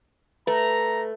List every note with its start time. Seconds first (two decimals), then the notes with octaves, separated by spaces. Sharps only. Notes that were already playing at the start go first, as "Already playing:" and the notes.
0.47 A3 B4 A#5